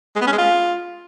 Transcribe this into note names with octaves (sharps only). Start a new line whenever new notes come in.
G#3
B3
C#4
G#3
F4